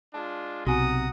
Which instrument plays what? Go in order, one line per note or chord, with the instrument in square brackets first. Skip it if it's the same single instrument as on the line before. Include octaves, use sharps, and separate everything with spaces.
[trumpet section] G#3 D4 F4 [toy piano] A5
[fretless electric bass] B1 [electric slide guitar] C3 [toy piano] F#4 G#5 [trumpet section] F#5 A#5 D#6